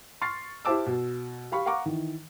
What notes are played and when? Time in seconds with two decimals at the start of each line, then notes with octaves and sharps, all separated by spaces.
0.21 C6 C#6 F6 A6 C7
0.65 E4 G4 C5 A5 D6 E6
0.86 B2
1.52 G4 F5 B5 C#6
1.66 F5 F#5 A#5 C#6 D6
1.86 D#3 E3